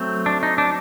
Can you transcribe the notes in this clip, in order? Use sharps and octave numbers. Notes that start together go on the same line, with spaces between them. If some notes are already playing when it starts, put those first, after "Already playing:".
Already playing: F#3 A3 C4
D4
D#4
D4